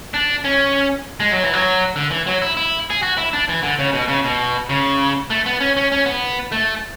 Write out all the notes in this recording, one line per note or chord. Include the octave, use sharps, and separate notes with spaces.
D4
C#4
G#3
F#3
E3
F#3
D3
E3
F#3
E4
E4
G#4
F#4
E4
D4
E3
D3
C#3
B2
C#3
B2
C#3
A3
B3
C#4
C#4
C#4
B3
A3